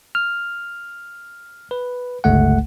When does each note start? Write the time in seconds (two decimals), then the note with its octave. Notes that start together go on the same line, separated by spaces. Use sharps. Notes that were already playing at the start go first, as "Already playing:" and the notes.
0.15 F6
1.71 B4
2.24 G1 C#2 A3 F#5